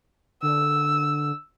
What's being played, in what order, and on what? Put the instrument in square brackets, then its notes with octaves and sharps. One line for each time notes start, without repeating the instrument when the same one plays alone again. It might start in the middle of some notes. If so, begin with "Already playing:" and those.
[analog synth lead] D3 [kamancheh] E6